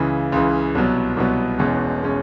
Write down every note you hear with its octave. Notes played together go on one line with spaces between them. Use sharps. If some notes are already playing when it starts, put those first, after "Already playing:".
Already playing: C#2 C#3 E3
C#2 C#3 E3
C2 B2 F#3 B3
C2 B2 F#3 B3
E1 E2 B2 G#3 C#4
B2 G#3 C#4